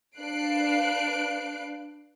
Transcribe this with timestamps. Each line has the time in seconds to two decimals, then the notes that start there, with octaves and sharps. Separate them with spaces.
0.19 D4 B4 F5 F#6 C7 D7